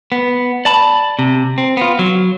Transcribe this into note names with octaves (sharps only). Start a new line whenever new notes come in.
B3
D5 A5 B5
C3
C4
B3 F4
F#3